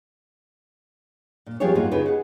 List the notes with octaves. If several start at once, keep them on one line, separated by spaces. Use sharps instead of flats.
A#2
F3 G3 B3 F4 G#4 C#5
G#2 A#3 F4 F#4
C#3 D#4 F4 B4
G#4 F#5